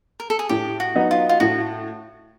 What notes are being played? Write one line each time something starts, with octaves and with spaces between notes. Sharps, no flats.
A#4
A4
G#4
A2 G4
F#4
F#3 B3 D#4
F4
F4
A2 F#4